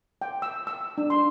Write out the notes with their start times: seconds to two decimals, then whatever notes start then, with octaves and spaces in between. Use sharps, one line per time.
0.22 G5
0.42 E6
0.67 E6
0.98 D4
1.10 C6